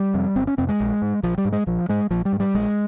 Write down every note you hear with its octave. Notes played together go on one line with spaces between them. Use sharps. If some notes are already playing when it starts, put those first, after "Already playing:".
Already playing: G3
F2 C3
G1 C4
C#4
F2 C3 C4
G#3
A#1
G#2
A#1 F3
G3
G#2
G#3
A#1 F3
G#2 G#3
A#1 F3
G3
G#2
G3
A#1 G#3